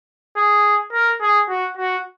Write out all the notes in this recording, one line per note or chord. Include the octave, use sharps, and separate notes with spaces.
G#4
A#4
G#4
F#4
F#4